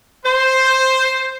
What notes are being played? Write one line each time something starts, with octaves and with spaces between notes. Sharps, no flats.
C5